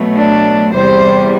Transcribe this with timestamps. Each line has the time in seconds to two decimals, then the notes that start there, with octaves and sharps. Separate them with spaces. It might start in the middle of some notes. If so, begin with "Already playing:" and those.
Already playing: B2 F#3 A3
0.17 D4
0.72 E2 C3 G3 C5